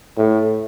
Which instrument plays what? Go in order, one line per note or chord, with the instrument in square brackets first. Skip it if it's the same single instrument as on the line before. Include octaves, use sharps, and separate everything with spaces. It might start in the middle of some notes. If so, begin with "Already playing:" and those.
[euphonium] A2